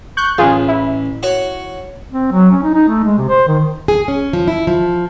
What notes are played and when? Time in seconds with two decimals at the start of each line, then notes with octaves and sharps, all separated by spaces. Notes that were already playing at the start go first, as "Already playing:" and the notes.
0.17 C#6 F#6 G6
0.38 A1 F4 G#4
0.68 E4
1.23 F#4 C#5
2.11 C4
2.32 F#3
2.51 C#4
2.63 D#4
2.74 D#4
2.88 A3
3.04 G#3
3.18 C3
3.29 C5
3.48 D#3
3.88 G#4
4.08 C#4
4.33 F3
4.48 E4
4.67 F3